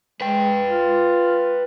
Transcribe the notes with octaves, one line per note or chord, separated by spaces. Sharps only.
G#3 B4 G5
F4